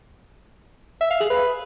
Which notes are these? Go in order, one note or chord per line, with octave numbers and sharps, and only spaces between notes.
E5
F5
G#4
B4